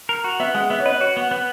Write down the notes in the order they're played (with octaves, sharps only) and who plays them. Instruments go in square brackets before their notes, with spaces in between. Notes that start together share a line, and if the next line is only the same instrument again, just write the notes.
[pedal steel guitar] A#4
F#4
[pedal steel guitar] B3 [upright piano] E5
[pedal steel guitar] G#3 [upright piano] F#5
[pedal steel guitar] B3 [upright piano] E5
[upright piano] C#5
[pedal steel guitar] B4 [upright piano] D#5
[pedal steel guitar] F#4 [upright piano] C#5
[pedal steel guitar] B3
B3